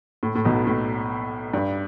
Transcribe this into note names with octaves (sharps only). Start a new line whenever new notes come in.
A2
A2
B1 B2
A2
G2